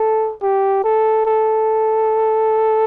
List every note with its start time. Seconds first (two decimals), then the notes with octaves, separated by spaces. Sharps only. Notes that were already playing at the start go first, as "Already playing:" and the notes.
Already playing: A4
0.42 G4
0.84 A4
1.26 A4